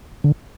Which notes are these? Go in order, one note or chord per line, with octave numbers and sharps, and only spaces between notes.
D3